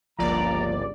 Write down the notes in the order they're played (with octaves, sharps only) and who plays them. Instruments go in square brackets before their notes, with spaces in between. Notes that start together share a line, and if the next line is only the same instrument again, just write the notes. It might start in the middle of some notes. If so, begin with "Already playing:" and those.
[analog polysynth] G1 C#2 D5 [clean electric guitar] F3 A#3 [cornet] A#5